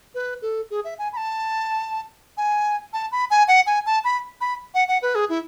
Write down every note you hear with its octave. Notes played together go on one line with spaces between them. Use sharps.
B4
A4
G#4
E5
G#5
B5
A5
G#5
A5
B5
G#5
F#5
G#5
A5
B5
B5
F#5
F#5
B4
G#4
E4